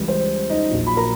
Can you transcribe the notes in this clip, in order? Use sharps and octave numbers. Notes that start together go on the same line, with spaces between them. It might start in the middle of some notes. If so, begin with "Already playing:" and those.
Already playing: C#2 C#3 E3 G3
C5
D#4 D#5
A#1 A#2 F#3
B5
A#4 A#5